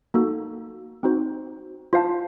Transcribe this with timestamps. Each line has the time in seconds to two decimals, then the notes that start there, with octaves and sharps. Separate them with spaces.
0.14 A#3 D#4 F#4 A4
1.03 C4 D#4 F#4 C5
1.93 F4 C5 F5 A5